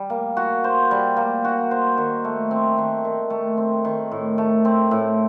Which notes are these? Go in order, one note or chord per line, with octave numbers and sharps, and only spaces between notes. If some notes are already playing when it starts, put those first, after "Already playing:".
Already playing: G3
A#3
F#4
C5
G3
A#3
F#4
C5
D#3
A3
C4
D#3
D#3
A3
C4
D#3
A2
A3
C4
A2